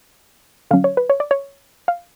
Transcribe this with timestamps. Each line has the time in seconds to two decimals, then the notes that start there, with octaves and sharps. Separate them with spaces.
0.71 D3 F#3 C#4 F5
0.84 C#5
0.97 B4
1.10 C#5
1.20 D5
1.31 C#5
1.88 F5